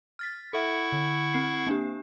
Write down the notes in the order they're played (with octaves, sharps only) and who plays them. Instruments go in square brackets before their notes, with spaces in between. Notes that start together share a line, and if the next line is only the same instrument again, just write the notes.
[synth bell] F6 A6 B6
[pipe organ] E4 F#5 C#6 [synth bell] A4 E5
[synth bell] D3
C4 C7
A#3 D4 G4